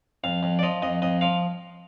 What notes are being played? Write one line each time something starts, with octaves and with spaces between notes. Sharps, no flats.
F2 F5
F2
D5
F3 D#5
F2 D#5
F2 D#5
F3 F5